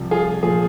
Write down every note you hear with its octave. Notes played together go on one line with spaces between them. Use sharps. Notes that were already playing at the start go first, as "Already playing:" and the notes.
Already playing: C2 C3 F3
F4 G#4
A#2 F3 F4 G#4